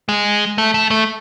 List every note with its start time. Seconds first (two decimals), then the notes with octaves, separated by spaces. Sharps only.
0.09 G#3
0.58 A3
0.74 A3
0.91 A3